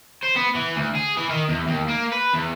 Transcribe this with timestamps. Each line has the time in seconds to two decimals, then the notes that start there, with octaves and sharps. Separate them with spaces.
0.23 C5
0.36 B3
0.55 E3
0.76 D2
0.95 G#4
1.17 E3
1.30 D#3
1.49 E2
1.68 D#2
1.88 A#3
2.12 B4
2.33 E2